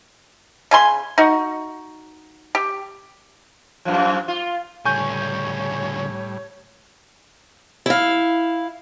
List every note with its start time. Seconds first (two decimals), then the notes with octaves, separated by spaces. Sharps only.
0.71 C#3 G#5 C6
1.18 D#4 F#4
2.55 G4
3.85 F#2 A#2 F3
4.28 F4
4.85 C#2 A2 D3 G3 C#5 G#5 C#6 G6
7.86 E4 F5